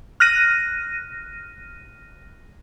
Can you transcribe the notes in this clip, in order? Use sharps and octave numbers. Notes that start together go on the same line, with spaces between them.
F6 F#6 A#6 D#7